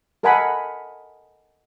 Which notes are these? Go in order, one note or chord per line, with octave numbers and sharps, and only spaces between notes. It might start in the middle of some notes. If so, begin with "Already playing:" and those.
A4 A#4 D#5 F#5 G#5 B5